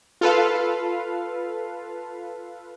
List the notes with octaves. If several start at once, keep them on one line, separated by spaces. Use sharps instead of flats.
F4 A4 B4 F5